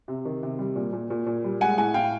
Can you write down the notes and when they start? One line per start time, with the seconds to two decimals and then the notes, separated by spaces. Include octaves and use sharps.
0.08 C3
0.25 D#3
0.43 C3
0.59 G3
0.76 A#2
0.93 A#2
1.10 A#2
1.27 A#2
1.44 G3
1.61 G#3 F#5 G#5
1.78 A2 F#5 G#5
1.94 A2 F5 G5